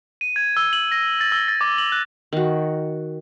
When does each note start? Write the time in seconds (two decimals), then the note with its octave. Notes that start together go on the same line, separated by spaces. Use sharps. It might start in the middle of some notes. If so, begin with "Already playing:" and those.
0.21 D#7
0.36 G#6
0.57 E6
0.73 F#7
0.92 A#6
1.21 A6
1.32 E6
1.48 A6
1.61 D6
1.78 F#7
1.92 F#6
2.33 D#3 F#4